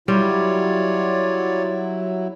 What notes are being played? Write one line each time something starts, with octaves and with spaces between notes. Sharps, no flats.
F#3 G3 E4 F4 C#5 D5